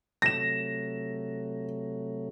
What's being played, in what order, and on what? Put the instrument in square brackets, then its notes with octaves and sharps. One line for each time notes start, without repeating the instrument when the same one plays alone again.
[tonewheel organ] C3 F#3 A3 [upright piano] A#6 E7